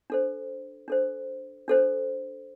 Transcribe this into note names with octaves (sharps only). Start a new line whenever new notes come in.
D4 A4 C5
D4 A4 C5
D4 A4 C5